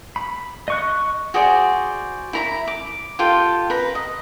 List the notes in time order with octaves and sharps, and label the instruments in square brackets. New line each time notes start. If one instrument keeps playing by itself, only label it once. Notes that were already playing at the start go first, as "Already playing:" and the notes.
[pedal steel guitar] B5
D#5 C#6 F#6
[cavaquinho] F#4 G#4 C5 D5
E4 A#5 B5
D6
F4 G4 A4 G5
B4 A#5
D#5